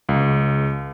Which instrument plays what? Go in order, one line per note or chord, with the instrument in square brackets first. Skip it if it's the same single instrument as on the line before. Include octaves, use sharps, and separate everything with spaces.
[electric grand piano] C#2